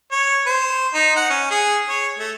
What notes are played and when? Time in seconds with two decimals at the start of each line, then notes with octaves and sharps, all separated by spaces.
0.12 C#5
0.46 C5
0.94 D#4
1.16 F#5
1.30 C#4
1.51 G#4
1.89 C#5
2.19 A3